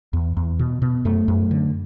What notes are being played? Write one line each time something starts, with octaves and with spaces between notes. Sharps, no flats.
E2
E2
B2
B2
F#2 A3
F#2
D3